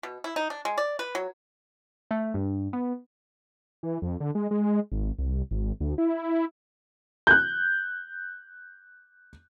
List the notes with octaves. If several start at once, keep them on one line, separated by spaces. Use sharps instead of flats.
B2
E4
D#4
D4
G#3
D5
B4
F#3
A3
G2
B3
E3
F2
D3
G#3
G#3
G#1
C2
G#1
D2
E4
F#6 G6